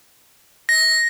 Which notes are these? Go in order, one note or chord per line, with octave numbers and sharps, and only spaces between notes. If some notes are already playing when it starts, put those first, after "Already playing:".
A#6